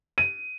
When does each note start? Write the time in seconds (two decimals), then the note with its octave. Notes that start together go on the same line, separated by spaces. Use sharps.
0.18 D#7